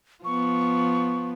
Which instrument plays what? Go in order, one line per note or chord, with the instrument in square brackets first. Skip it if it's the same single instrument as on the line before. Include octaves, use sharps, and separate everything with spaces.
[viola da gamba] F3 B3 [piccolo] C#6